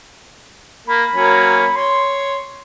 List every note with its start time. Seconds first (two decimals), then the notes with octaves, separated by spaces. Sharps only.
0.87 A#3 B5
1.15 F#3 A#3 C#4
1.76 C#5 C6